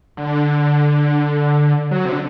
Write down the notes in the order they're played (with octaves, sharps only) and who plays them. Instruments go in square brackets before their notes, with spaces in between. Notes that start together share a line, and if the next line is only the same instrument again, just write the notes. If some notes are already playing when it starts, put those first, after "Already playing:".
[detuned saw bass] D3
F#3
C3
D3